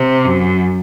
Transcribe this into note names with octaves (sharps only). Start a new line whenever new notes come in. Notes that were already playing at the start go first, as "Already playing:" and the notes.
Already playing: C3
F#2